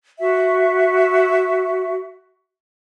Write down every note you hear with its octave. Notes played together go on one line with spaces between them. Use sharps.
F#4 E5